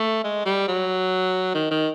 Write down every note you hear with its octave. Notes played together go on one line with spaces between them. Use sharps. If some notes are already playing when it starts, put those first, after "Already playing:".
Already playing: A3
G#3
G3
F#3
D#3
D#3